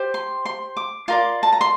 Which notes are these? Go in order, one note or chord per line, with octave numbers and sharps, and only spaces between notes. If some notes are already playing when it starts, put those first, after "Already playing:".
Already playing: G4 C5
C6
C6
D6
F4 A#4 D5 C6
A5
A#5
C6